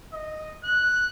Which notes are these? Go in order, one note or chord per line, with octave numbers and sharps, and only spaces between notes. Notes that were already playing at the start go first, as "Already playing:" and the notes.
D#5
F#6